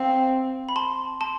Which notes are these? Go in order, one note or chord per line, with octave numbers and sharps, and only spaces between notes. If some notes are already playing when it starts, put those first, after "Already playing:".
Already playing: C4 F5
B5
A5 C6
A5 C6